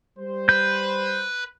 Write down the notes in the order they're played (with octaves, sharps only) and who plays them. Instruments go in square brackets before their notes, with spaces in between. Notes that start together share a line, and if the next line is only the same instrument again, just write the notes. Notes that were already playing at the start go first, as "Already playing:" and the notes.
[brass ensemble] G3 C5
[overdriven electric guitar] B4 [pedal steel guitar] G6